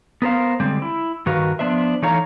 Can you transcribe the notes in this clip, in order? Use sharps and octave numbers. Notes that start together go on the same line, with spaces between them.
B3 A#4 C5 F5
D3 G3 G#3 C4
E4
G2 D#3 F#4 A#4 B4 F5
F3 G3 B3 D4 C5 E5
E3 A3 D#4 C#5 F5 A#5